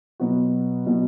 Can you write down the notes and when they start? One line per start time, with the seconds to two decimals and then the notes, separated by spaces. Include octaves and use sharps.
0.20 B2 F#3 B3 F#4
0.87 B2 F#3 B3 F#4